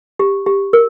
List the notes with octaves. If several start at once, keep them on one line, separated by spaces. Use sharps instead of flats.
G4
G4
A#4